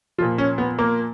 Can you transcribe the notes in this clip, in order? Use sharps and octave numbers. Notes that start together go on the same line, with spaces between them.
A#2 F3 F4
C#4
B3
A#3